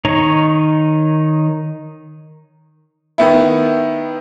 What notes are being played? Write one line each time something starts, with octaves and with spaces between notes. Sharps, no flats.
D#3 D#4 C#5 A#5
D#3 B3 E4